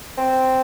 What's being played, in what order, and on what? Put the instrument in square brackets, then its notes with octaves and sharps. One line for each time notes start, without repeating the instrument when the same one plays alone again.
[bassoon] C4